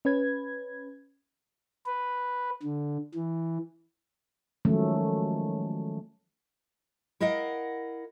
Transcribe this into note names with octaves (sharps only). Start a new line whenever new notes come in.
C#4 B4 G#6
B4
D3
E3
D#3 F3 F#3 G#3 A3 C#4
E4 A#4 D#5 F5 F#5